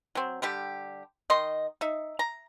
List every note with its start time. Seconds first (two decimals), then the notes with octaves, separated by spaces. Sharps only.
0.15 F#3 C4
0.42 D3 G3 G4
1.30 D#3 D#4 D#5 C6
1.81 D#4 E5
2.19 A#5